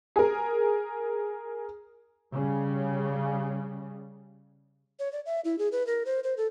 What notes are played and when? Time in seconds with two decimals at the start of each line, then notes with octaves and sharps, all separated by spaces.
0.16 G#4 A#4
2.33 C#3 G3
4.99 C#5
5.13 D5
5.26 E5
5.45 E4
5.59 G#4
5.72 B4
5.87 A#4
6.06 C5
6.24 C5
6.37 A4